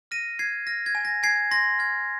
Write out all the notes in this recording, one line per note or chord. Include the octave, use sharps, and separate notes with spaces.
F6 A#6 D#7
F6 G#6 C7
F6 A#6
G#6
G#5
A#6
G#5 G#6 C7
C6 A#6
F6 G#6